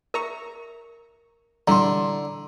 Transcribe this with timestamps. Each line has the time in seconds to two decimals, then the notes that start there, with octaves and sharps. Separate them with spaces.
0.14 A#4 E5 A#5 C#6
1.68 D3 E3 G3 E4 A#5 C6